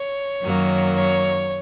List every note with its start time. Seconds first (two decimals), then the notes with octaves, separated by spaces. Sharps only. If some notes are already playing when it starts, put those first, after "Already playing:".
Already playing: C#5
0.42 F#2 D#3 F#3 A#3
0.96 C#5